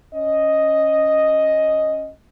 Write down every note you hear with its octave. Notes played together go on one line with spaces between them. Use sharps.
C#4 D#5